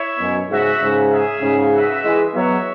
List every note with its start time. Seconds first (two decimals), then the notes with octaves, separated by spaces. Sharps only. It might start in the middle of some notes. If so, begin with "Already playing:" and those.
Already playing: E4 C#5 E5
0.18 F#2 B2
0.49 G#2 C#3 F#4 E5
0.80 G#2 C#3
1.11 C#4 G#4 E5
1.41 G#2 C#3
1.73 F#4 B4 E5
2.03 E3 G#3
2.34 F#3 B3 F#4 C#5 E5